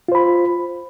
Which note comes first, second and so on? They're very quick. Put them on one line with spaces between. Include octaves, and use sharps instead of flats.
F4 C5 B5